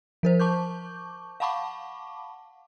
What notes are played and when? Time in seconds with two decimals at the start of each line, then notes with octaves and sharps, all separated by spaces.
0.23 F3 A#4 C5
0.39 A5 C#6 D6 G6
1.40 F5 F#5 A5 B5 C#6 D6